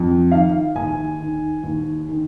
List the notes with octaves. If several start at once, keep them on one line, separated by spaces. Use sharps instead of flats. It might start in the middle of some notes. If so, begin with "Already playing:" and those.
Already playing: F2
D#3 F5
D#2 G#5
D#3
D#2
D#3